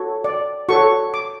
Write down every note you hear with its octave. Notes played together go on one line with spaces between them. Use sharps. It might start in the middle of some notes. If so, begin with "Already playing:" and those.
Already playing: F#4 A4 C#5
D5
F#4 A4 C#5 C#6
D6